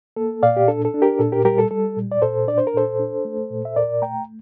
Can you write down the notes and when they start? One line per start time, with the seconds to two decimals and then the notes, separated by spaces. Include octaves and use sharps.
0.16 A#3 A4
0.43 A#2 D5 F5
0.57 G4
0.68 D4 A4
0.85 A4
0.94 D4
1.02 G4 A#4
1.19 A#2 A4
1.32 G4 A#4
1.45 G3 G4 A#4
1.58 A4
1.71 G3 A4
1.97 A#2
2.11 D5
2.22 A#2 A4 C5
2.48 D4 D5
2.58 C5
2.67 A#4
2.74 A#2 A4 C5
3.00 D4
3.25 A3
3.50 A#2
3.65 E5
3.76 A#2 A#4 D5
4.02 A3 G5 A#5